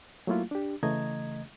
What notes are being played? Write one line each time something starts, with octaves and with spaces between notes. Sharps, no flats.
F#3 A3 A#3 E4 F4
D4 G4
C#3 E3 A3 D#5 A#5 G#6